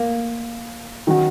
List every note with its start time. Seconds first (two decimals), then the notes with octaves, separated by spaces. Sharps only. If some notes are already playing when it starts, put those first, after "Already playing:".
Already playing: A#3
1.07 D#3 F#3 C#4 F#4